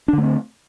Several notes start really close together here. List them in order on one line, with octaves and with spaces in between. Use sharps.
D4 D3 A3 C4